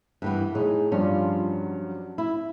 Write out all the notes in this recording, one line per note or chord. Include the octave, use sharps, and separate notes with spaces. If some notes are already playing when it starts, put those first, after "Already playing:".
G2 E3 B3
A2 D#4 G#4
G2 F3 G3 C#4 F4
F#3
E4